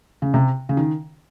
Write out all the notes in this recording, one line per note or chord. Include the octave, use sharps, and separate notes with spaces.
C#3
C3
C#3
D#3